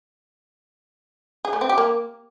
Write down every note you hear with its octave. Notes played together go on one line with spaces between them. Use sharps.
G#4
A3
C4
G4
A#3